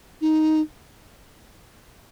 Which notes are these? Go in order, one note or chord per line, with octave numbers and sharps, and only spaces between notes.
D#4